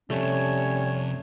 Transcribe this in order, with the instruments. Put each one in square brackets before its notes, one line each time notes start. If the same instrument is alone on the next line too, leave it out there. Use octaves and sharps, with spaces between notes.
[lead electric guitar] F2 C3 [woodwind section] G3 C#4 C#5 [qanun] A3